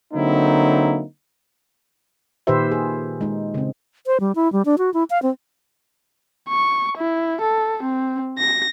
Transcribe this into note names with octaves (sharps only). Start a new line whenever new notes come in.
D3 F#3 A#3 C4 D#4 E4
A#2 D#3 G4 B4 C5 E5
G#4
G#3 D#4
C#3 C4
C5
G3
E4
G3
D4
F#4
E4
F5
C4
C#6
E4
A4
C4
A#6